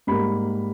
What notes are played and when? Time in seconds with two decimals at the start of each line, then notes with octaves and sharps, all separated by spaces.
0.07 G#2 G3 A#3 B5